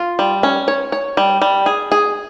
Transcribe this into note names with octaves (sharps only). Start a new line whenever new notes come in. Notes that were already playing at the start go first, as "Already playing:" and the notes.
Already playing: F4
G3
C#4
C#5
C#5
G3
G3
G#4
G#4